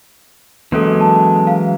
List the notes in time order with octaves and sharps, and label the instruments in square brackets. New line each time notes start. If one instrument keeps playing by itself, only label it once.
[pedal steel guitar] E3 F#3 G#3 [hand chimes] A#3 C#4 A4
[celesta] A5
F5